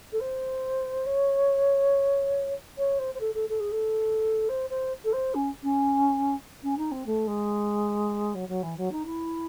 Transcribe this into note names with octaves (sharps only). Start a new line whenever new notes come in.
A4
C5
C#5
C#5
C5
C5
A4
A4
A4
G#4
A4
C5
C5
A4
C5
C#4
C#4
C#4
D#4
C4
A3
G#3
F#3
F#3
E3
F#3
D#4
E4